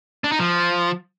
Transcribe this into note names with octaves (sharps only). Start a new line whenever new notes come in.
D4
D#4
F3